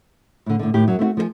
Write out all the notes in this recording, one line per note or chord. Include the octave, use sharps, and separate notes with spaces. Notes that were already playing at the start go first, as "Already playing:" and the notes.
A2 D3
A2 D3
A2 D#3 G4
F#2 F#3
A3 C4 E4 F#4
F3 A#4 G#5